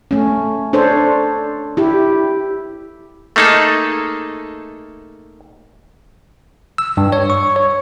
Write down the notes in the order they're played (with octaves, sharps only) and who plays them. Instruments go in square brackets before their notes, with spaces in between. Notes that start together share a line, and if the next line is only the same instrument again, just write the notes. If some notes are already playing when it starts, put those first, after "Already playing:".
[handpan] A3 C#4
D4 A4 C5 C#5
E4 G4
[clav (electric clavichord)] A3 A#3 D#4 G#4 A4
[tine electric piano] E6
G2
C#5
C#6
C#5